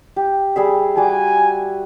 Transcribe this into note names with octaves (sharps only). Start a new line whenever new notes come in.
G4
G3 G#4 E5
G3 F#4 G#5 D6